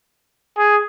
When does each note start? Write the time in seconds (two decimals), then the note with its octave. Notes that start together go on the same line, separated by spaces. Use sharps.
0.57 G#4